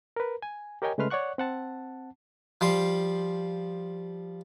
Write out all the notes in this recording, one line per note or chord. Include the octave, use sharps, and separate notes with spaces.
A#4 B4
G#5
G4 A#4 C#5 D#5 G5 G#5
C#3 G#3 A3 B4 C6 F6
C#5 D5 F#5 C#6 F#6
C4 F#5 A5
F3 G3 C6